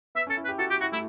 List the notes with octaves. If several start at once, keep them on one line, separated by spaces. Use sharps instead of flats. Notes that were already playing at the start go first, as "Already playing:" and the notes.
B3 E5
C#4
A4
E4
B4
G4
F#4 A4
F#4 G4
E4 F#4
A3 E4